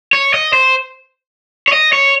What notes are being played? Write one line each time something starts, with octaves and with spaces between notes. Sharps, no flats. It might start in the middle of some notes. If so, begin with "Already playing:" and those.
C#5
D#5
C5
C#5
D#5
C#5